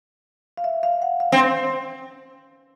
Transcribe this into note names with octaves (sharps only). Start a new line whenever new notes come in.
F5
E5
F5
F#5
F5
C4